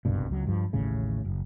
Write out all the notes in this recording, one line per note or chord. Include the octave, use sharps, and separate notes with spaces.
F#1 C2 G2 B2
C#2 F#3
G2 F3
A1 D#2 A2 C#3
F#1